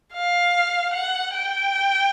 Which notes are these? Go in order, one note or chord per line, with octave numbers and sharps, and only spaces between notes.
F5
F#5
G5